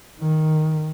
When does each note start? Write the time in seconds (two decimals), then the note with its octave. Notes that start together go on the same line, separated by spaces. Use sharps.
0.20 D#3